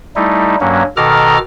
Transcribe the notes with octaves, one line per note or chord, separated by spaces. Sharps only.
G3 A3 D#4 E4
G2 F#3 A#3 C#4
B2 D#3 A4 A#5 D6 F6